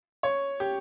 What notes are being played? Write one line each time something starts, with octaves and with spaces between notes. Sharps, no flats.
C#5
G4